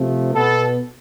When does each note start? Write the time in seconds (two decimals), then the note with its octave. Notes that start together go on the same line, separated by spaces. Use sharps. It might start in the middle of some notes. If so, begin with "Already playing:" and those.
Already playing: C3 F3 A3
0.33 B2 B3 A4